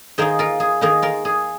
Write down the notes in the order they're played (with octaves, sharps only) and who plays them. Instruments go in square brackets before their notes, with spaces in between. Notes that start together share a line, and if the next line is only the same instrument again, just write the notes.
[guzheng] D#3 A#3 D#4 G#4 C5
F4 A#4
G#4
D#3 A#3 D#4 G#4
F4 A#4
G#4